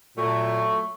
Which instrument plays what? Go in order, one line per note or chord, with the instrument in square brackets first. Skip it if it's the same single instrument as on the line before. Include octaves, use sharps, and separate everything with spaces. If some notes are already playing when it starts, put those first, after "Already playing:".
[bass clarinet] A#2 [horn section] F#3 A3 [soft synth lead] C#6